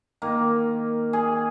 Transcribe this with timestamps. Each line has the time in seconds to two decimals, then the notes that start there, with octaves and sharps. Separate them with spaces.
0.22 D#3 A#3
1.13 G#4